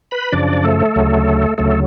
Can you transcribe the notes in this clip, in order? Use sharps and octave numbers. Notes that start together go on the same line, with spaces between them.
B4 B5
F#2 C#3 F3 D4 D5
A3 A4
D2 C#3 F#3
D2 C#3 F#3 A3 A4